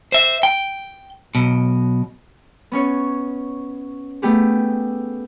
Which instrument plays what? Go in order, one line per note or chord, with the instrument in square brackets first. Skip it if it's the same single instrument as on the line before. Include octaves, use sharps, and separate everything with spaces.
[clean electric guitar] C5 E5
G5
B1 B2
[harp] B3 C#4 C#5
A3 B3 G4 G#4